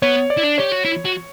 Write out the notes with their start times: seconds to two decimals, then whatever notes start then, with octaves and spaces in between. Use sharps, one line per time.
0.02 B3 C#5
0.30 D5
0.38 E4
0.44 D4
0.58 G4 C#5
0.72 F#4
0.85 E4
1.05 F#4